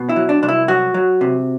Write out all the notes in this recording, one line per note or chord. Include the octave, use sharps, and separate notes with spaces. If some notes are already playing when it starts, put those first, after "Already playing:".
Already playing: B2
E4
F#3
D4
C2 D4
E4
F#3 F#4
F#3
C3